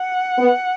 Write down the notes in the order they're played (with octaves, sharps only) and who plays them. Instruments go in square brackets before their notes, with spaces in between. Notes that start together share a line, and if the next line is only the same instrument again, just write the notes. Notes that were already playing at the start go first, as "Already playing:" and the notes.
Already playing: [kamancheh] F#5
[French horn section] B3